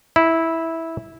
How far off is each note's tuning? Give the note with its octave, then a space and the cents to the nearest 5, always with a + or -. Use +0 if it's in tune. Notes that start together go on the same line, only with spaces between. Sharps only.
E4 -10